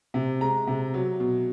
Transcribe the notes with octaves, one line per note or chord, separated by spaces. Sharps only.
C3
G#3 A#5
C3
F#3
B2